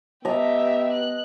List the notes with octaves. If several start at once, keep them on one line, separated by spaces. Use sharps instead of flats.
B3 G4 D#5 E5 A#5
F#6